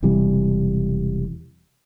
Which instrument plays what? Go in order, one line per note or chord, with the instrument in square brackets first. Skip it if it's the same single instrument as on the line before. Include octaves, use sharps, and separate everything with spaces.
[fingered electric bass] E1 C3 E3 G3